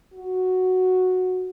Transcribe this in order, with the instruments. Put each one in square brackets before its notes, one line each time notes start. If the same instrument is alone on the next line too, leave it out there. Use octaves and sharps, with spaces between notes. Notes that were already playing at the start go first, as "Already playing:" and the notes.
[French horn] F#4